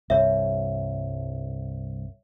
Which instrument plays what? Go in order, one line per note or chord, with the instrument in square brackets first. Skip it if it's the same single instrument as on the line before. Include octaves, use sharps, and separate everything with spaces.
[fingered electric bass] C2 G2 [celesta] C#5 E5